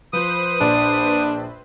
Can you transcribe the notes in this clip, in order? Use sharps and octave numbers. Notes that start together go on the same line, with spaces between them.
F3 B4 C5 D#6
A#1 D4 D5